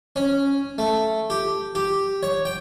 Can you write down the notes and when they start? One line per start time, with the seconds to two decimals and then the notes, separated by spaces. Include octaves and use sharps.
0.16 C#4
0.78 A3
1.30 G4
1.75 G4
2.23 C#5
2.45 G5